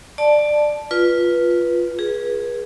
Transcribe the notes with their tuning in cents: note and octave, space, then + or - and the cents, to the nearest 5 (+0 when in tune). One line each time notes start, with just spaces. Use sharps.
D5 +15 A5 -5
F4 +0 B4 -15
G#4 +0 B4 -30